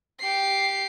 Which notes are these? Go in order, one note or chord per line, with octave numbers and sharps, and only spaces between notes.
G4 C7